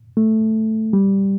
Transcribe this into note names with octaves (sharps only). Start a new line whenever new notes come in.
A3
G3